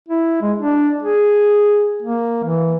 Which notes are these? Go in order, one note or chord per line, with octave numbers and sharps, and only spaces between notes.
E4
G#3
D4
G#4
A#3
E3